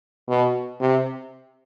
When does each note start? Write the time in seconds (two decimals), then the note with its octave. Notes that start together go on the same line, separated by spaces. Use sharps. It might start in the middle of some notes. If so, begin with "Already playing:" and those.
0.28 B2
0.81 C3